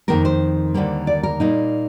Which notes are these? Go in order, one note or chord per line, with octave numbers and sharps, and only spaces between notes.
F2 D#3 A#3 A#4
C5
D#2 D3 G3 A#3
D5
A#4
A#2 G3 A#3 D#4